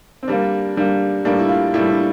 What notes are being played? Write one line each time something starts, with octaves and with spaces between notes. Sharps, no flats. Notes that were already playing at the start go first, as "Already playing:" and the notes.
C4
D3 G3 A#3 D4
D3 G3 A#3
A2 G3 A#3 D4
E4
F4
A2 G3 A#3 E4
D4